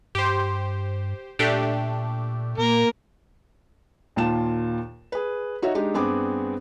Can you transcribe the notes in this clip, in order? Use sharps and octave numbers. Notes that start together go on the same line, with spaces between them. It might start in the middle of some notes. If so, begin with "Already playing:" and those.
G2 G4 C5
A#2 A3 D4 G4
A#2 A#3 A#4
D#2 A#2 F4 A5 E7
G#4 B4
D#4 F#4 C#5 E5
G#3 D4 D#4 G4
G2 B3 C4 G#4 D6